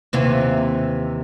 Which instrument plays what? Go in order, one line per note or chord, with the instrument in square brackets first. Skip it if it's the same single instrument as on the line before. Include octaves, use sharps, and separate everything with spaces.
[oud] D#2 C3 E3